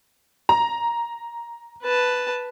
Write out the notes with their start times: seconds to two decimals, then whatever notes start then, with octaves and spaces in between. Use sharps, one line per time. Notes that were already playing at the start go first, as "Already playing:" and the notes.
0.49 A#5
1.83 B4 A5